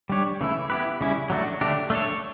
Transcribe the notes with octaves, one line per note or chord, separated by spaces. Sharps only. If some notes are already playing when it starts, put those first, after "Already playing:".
G3 D4 G4 C#5
C#3 E3 A3 E4
B3 E4 G4 B4
C#3 G3 C#4 E4
F#3 A3 D4 F#4
D3 A3 D4 G4
A3 D4 A4 C#5